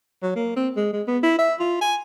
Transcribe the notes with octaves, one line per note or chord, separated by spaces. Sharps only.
F#3
A#3
C4
G#3
G#3
B3
E4
E5
F4
G#5